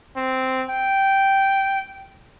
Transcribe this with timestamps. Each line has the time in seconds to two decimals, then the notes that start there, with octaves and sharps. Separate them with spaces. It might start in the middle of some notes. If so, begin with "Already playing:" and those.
0.17 C4
0.70 G5